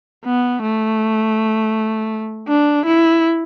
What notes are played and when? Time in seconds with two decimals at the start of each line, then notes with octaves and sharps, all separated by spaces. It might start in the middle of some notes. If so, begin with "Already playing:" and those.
0.25 B3
0.62 A3
2.48 D4
2.86 E4